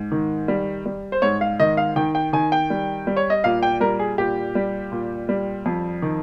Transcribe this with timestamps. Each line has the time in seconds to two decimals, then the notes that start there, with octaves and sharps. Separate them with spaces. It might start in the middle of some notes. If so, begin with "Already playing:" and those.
Already playing: G#2
0.12 D#3
0.48 G3
0.86 G3
1.12 C5
1.22 G#2 C#5
1.41 F5
1.60 D#3 D#5
1.77 F5
1.96 D#3 G5
2.15 G5
2.33 D#3 G#5
2.52 G5
2.70 G3
3.07 G3
3.17 C#5
3.30 D#5
3.44 A#2 F5
3.63 G5
3.80 G3 A#4
3.99 G#4
4.18 A#2 G4
4.55 G3
4.92 A#2
5.29 G3
5.66 F2
6.02 D#3